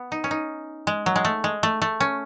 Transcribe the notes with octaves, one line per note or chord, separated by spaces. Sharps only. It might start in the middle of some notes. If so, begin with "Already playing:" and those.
Already playing: B3
D#4
C#4
D#4
G#3
F#3
G#3
A3
G#3
A3
A3
C#4